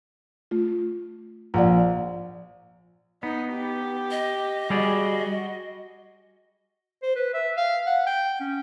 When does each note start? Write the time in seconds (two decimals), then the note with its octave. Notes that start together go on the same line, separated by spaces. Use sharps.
0.51 A3 F4
1.54 A#1 D5 F#5 A#5
3.23 B3 D#4
3.54 G4
4.11 D#5
4.70 G3 F#4 G#4 D5
7.03 C5
7.16 B4
7.34 E5
7.57 F5
7.87 F#5
8.07 G5
8.40 C#4